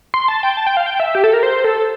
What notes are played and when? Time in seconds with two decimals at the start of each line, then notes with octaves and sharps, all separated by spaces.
0.14 C6
0.28 A5
0.43 G5
0.57 A5
0.67 G5
0.77 F5
0.86 G5
1.00 E5
1.15 G4
1.24 A4
1.33 A#4
1.43 C5
1.64 A4